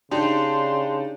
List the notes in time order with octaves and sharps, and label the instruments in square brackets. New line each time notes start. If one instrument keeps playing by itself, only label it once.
[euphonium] C#3 [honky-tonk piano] D4 D#4 G4 [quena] C6